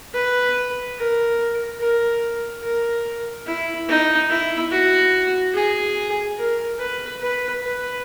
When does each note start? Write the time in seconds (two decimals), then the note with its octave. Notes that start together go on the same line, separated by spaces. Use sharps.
0.14 B4
0.97 A#4
1.80 A#4
2.63 A#4
3.47 E4
3.88 D#4
4.30 E4
4.71 F#4
5.54 G#4
6.37 A#4
6.79 B4
7.21 B4
7.62 B4